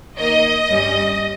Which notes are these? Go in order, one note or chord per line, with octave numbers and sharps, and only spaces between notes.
D#3 A#3 D#4 D#5
G2 G3 C#4